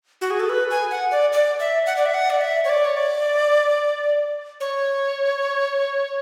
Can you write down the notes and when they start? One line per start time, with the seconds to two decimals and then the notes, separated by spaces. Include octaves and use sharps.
0.21 F#4
0.30 G#4
0.40 A4
0.49 B4
0.71 G#5
0.91 F#5
1.11 D5
1.33 D5
1.60 E5
1.86 F#5
1.97 D5
2.06 E5
2.14 F#5
2.30 D5
2.41 E5
2.65 C#5
2.69 D5
2.85 C#5
2.97 D5
4.60 C#5